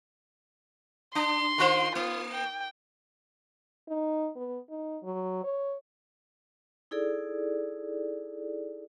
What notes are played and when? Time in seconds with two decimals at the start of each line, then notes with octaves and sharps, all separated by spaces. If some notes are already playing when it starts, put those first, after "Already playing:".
1.15 D4 C6
1.58 D#3 F4 C5
1.95 A#3 F4
2.32 G5
3.88 D#4
4.36 B3
4.70 D#4
5.03 F#3
5.44 C#5
6.91 D#4 E4 G#4 A4 D5